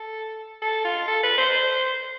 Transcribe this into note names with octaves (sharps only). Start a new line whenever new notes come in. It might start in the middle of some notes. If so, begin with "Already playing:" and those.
Already playing: A4
A4
F4
A4
B4
C5